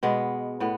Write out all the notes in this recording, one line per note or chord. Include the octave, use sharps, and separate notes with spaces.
B2 G#3 B3
A2 B3